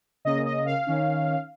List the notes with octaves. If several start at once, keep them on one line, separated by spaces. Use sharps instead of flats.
C#3 A#3 C#4 D#5
D#5
F5
D#3 C#4